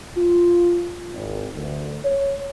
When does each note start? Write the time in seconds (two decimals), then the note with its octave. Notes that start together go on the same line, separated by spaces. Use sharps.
0.17 F4
1.14 G#1
1.56 D2
2.05 C#5